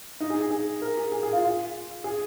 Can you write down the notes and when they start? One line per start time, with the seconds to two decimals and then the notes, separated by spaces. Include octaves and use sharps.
0.20 D#4
0.30 G#4
0.41 G#4
0.51 G#4
0.82 A#4
0.97 G#4
1.12 G#4
1.23 G#4
1.33 F4
1.43 F4
2.04 G#4